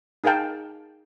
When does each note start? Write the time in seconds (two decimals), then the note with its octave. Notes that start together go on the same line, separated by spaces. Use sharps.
0.24 D#4 G#4 A#4 F5 G5 A5